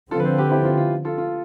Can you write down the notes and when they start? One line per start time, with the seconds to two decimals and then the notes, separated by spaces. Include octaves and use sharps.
0.11 D3 F3 C4 F4 A4
0.20 B4
0.24 A4 C5
0.38 G4 B4
0.51 E4 G4
0.65 F4
0.77 F4
1.05 F4 A4
1.18 F4